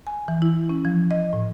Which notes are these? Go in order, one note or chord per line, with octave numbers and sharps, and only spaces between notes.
G#5
E3
E4
C#4
F3
D#5
A2